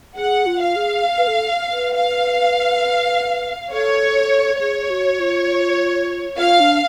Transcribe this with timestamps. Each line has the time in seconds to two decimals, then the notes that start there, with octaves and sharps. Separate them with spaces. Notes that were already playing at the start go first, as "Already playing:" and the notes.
0.16 G#4 F#5
0.46 F4
0.60 F5
0.76 G#4
1.18 B4
1.27 A4
1.72 B4
1.93 F5
3.71 A4 C#5
4.60 G#4 C#5
4.90 F#4
5.20 F4
6.37 F4 F5
6.60 D4